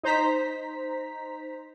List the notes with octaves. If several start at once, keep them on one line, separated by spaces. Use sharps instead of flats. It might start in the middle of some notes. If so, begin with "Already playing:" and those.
D#4 C5 A#5 B6